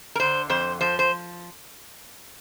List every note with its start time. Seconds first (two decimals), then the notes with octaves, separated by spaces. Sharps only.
0.15 A#4
0.20 D3 C5
0.50 F2 C5
0.81 F3 C5
0.99 C5